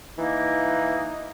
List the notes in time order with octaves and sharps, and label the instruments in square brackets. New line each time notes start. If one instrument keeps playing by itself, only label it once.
[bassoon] E3 [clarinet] A#3 [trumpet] D#4